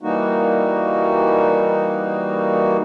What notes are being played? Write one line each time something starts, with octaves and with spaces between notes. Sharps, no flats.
E3 G3 A#3 D#4 F#4